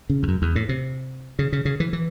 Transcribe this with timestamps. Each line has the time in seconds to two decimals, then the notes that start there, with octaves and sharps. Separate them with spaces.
0.10 C#3
0.23 E2
0.28 F#2
0.42 E2
0.56 A2
0.69 C3
1.39 C#3
1.52 C#3
1.65 C#3
1.80 E3
1.93 E3